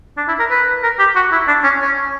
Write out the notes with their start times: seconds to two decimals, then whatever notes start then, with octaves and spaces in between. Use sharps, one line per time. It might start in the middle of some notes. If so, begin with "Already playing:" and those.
0.17 D4
0.28 E4
0.39 A#4
0.50 B4
0.83 A#4
0.99 G4
1.16 F#4
1.32 E4
1.47 D4
1.63 C#4
1.81 C#4